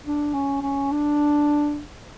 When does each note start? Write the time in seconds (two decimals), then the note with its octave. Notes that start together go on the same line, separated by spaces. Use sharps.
0.05 D4
0.34 C#4
0.62 C#4
0.91 D4